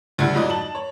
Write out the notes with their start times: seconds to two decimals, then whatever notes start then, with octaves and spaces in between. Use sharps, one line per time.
0.18 F#1 D2 D3 G3 E4 F#5
0.34 F2 G#2 F#3 D5 D#5
0.50 A5 F#7
0.75 C#5